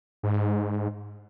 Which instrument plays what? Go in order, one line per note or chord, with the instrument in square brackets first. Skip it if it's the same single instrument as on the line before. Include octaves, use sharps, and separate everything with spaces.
[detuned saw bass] G#2